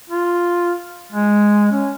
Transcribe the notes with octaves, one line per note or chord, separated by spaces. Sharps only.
F4
G#3
C#4